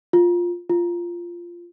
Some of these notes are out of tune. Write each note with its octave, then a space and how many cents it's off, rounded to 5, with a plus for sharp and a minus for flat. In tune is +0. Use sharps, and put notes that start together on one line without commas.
F4 +5
F4 -10